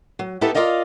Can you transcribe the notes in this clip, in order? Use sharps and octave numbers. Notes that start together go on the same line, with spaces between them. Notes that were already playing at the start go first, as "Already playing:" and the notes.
F#3
B3 D#4 E4 G4 A4 B4
F4 A#4 D5 D#5 F5